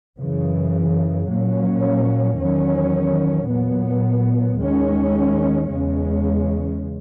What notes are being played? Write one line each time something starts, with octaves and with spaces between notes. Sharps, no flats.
F#2 C#3 E3
A#2 F#3 A#3 C#4
E2 D#3 F#3 C#4
A#2 F#3 B3
D#2 D#3 G#3 C#4
E2 C#3 G#3 C#4